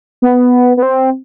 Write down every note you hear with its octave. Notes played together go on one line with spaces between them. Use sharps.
B3
B3
C4